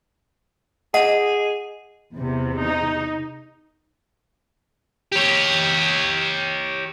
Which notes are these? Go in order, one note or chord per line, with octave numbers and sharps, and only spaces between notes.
G#4 D#5 F#5
E2 C3
D#4
G4 C#5